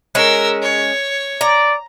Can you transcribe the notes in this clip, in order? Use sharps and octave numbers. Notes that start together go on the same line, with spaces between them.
G#3 C#4 A#4 E6
C#5
D5 A#5